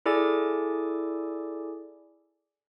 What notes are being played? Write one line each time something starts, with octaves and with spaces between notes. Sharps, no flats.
E4 G#4 A4 D5 G#5 D6